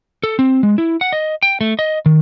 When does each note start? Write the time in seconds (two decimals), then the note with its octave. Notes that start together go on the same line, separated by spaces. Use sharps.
0.24 A4
0.39 C4
0.63 G#3
0.78 E4
1.01 F#5
1.12 D#5
1.43 G5
1.61 A3
1.79 D#5
2.06 D#3